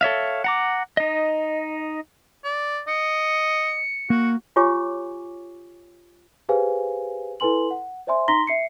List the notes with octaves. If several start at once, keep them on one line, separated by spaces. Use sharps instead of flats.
A4 C#5 E5 F5
F#5 A#5 D6
D#4 D#5
D5
D#5 C#7
A#3 F#4
F4 G4 C#5 G#5 C#6 D6
G4 G#4 B4 C5 F5 G#5
E4 A4 B4 G#5 C6 F#7
F#5
C5 D5 E5 G#5 C6
D#4 A#5 C6 A#6 B6 G7
E5 C7 C#7